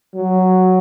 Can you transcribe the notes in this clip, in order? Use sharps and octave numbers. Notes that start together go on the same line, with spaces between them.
F#3